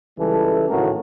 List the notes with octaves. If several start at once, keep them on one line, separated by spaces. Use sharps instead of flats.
C#2 E3 G3 A4
G#1 A2 C#3 F#4 A#4